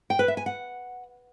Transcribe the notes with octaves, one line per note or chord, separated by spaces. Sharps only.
G5
B4
E5
G#5
F#5